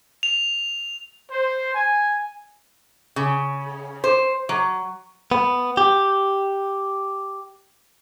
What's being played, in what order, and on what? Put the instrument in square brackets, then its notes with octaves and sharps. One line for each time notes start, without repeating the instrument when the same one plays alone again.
[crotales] F7
[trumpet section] C5
G#5
[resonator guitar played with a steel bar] C#3
C5
F#3
[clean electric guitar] B3
G4